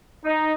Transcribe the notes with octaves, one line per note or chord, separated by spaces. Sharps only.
D#4